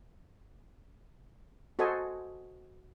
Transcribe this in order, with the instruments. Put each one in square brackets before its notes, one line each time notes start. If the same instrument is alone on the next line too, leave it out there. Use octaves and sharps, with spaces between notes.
[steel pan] F#4 A4 C5 D#5 G#5